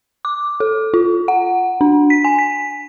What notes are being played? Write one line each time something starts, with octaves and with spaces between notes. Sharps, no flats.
D6
A4
F4
F#5
D4
B6
G#5
B6